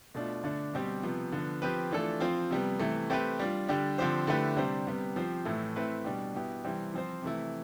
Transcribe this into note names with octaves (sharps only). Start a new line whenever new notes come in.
B2 A3 D4 F4
D3 A3 D4
B2 G3 C4 G4
C3 F3 B3
D3 F3 B3
F3 C4 G4 B4
E3 A3 D4 F4 A4
F3 C4 F4
C3 G3 B3
C3 E3 A3
A3 C4 G4 B4
G3 D4 F4
D3 G3 D4 G4
D3 F3 C4 G4 C5
D3 A3 E4 G4 B4
C3 G3 D4 G4 C5
C3 G3 B3
F3 C4 G4 C5
A2 E3 A3 E4
A3 C4 E4 B4
B2 G3 D4 G4
B2 B3 E4 G4
C3 E3 G3 C4
F3 C4 F4 C5
C3 E3 A3 E4